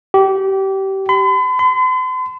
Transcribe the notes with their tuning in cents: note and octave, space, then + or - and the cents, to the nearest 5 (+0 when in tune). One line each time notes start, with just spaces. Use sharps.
G4 -25
B5 +45
C6 -45